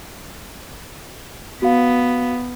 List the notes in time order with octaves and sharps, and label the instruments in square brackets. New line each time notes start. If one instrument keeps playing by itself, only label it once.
[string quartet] B3 [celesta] F#4 F5